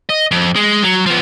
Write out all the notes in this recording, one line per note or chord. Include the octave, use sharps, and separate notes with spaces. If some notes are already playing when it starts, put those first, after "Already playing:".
D#5
F2
G#3
F#3
F3 B3